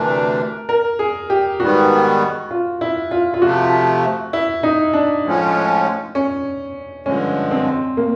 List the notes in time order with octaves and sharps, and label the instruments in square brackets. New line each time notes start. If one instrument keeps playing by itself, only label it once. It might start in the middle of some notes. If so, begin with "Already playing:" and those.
Already playing: [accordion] D2 C3 E3 A3 D4 [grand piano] A#4
[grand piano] A#4
G#4
G4
[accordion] G#2 D#3 G3 B3 [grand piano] F#4
[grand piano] F4
E4
F4
F4
[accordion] C3 F3 A3 [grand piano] F#4
[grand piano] E4
D#4
D4
[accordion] A2 F3 G#3 C#4
[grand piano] C#4
[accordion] G2 D3 F3 G#3 [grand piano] C#4
[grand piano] C4
A#3